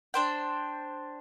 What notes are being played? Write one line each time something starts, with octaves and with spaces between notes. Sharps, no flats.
D4 C5 G5